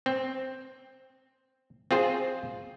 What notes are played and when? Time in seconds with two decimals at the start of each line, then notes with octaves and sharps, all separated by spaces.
0.06 C4
1.91 C4 F4 G#4 C5